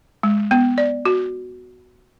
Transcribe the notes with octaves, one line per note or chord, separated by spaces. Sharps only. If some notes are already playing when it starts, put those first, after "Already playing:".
G#3
B3
D5
F#4